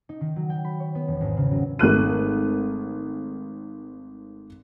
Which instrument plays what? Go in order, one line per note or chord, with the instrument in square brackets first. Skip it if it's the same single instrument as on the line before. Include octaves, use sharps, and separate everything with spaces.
[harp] D#4
D#3
F#3
G5
B5
C#5
B3
E1
G#1
C#3
F#3
[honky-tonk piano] G#1 A3 F#6 D#7